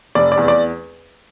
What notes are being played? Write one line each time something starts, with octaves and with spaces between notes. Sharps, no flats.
F1 D5
D5
E2
D5